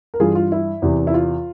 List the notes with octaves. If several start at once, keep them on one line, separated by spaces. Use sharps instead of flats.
A#4
G2 E3 F4 G#4
F4
E4
E2 C3 E3
E4
F4